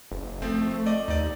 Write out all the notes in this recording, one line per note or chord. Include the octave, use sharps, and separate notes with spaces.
F#1
F3 A3 C4
D5 D#5 D6
D#2 D#4 D5